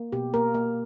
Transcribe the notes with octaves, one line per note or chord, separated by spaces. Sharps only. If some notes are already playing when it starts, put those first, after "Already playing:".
Already playing: A#3
B2 G4
A#3 A#4
A#3